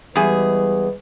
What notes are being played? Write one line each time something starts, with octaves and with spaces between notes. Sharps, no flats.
E2 G3 G#3 G#4 B4